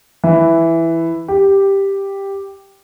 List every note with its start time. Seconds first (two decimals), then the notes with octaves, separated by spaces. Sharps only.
0.24 E3
1.28 G4